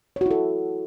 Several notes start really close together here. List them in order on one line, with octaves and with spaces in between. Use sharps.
C#5 F#4 E4 A4